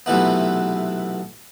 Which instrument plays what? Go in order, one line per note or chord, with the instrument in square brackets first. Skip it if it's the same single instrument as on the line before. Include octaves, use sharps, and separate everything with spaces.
[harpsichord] B1 C3 E3 A3 B3